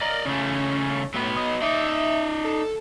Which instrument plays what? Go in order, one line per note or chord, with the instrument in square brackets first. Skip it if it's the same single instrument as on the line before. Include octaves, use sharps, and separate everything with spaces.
[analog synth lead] A#4 [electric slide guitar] D5 D#5
[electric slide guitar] C#3 A3 [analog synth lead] C#4
[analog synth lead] A2 [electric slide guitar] F#3 B3
[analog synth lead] D#5
[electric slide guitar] D#4 D5 [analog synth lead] E5
[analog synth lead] A4